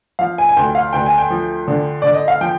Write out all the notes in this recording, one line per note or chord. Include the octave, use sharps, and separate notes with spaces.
F3 F5
G#5
G#5
D2 G5
F5
D2 G5
G#5
G5
F3
D3
D3 D5
D#5
F5
F3 G5